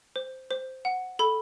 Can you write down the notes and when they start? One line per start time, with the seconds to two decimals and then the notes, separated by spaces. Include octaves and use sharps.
0.16 C5
0.51 C5
0.85 F#5
1.19 A4 B5